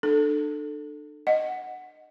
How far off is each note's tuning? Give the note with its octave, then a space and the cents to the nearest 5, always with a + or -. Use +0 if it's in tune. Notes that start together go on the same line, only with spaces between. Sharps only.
D4 +35 A4 +0
D#5 +0 F#5 +0